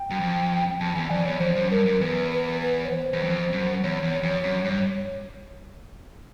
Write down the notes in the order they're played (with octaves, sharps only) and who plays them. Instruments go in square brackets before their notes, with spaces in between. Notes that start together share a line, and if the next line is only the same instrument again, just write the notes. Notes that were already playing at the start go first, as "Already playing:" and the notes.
Already playing: [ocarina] G5
[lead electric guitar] F#2
F2
[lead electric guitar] F2 [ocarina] A5
[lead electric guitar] E2 [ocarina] G#5
[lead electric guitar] F2 [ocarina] D5
[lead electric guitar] E2 [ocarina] C#5
[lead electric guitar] F2 [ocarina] C5
[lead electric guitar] F#2
[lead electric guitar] G2 [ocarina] A#4
[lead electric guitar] F#2
[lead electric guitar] E2 [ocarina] B4
[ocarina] B4
B4
C#5
C5
[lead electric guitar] E2
F2
F#2
[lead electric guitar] E2 [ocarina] C#5
[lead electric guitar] E2
F2
F#2
G2